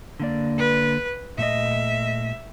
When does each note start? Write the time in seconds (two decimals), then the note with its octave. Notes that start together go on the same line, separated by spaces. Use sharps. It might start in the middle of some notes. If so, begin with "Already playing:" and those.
0.20 D3 A#3 D5
0.58 B4
1.38 A#2 A3 D#5 E5